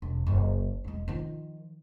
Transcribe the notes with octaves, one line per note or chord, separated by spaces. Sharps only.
E1
F#1
E1 G#3
D#3 F3